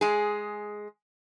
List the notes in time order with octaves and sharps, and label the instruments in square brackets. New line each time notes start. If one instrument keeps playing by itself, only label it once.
[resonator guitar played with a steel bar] G#3 G#4